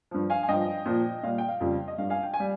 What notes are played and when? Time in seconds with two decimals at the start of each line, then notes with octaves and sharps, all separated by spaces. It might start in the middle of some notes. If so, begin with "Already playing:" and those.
0.11 G2 F3
0.30 F5 G#5
0.43 G#5
0.48 G2 F3 D#5 G5
0.86 A#2 F3
1.23 A#2 G3 F5
1.38 G5
1.48 F5
1.60 F2 C#3 G3
1.88 D#5
1.98 G2 G3 F5
2.10 F5 G#5
2.23 G5
2.34 G#5
2.40 G3